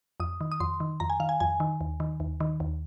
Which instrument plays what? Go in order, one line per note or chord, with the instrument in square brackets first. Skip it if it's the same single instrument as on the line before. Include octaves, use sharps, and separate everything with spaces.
[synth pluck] F2 D#6
D#3
D#6
F2 C6
D#3
F2 A#5
G#5
D#3 F5
G#5
F2 G#5
D#3
D#2
D#3
D#2
D#3
D#2